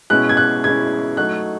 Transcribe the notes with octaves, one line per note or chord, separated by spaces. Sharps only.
B2 G#3 C#4 E4 F#6
G#6
F#6
B2 G#3 C#4 E4 G#6
F#3 A3 D#4 F#6